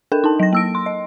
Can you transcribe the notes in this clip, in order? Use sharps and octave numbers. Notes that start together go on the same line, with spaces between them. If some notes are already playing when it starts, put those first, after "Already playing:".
D4 A4 A#4 G5
D#4 A5
F#3 A#6
A#3 E6 D7
C6
D#5